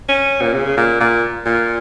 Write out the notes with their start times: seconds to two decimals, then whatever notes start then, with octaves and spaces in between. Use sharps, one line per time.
0.09 C#4
0.42 A#2
0.54 C#3
0.77 A#2
1.01 A#2
1.46 A#2